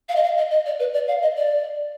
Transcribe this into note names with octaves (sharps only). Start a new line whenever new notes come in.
F5
D#5
F5
D#5
D#5
D5
B4
D5
F5
D#5
D5